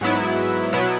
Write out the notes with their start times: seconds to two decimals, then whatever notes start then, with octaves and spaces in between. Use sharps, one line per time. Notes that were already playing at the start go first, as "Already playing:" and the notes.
0.01 G#2 F#3 B3 E4
0.73 B2 F#3 B3 E4